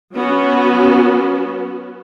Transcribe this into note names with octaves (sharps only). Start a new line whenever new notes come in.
F#3 B3 C#4 F#4